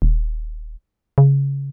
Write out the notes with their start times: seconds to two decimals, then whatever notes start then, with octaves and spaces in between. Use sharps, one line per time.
0.02 D#1
1.18 C#3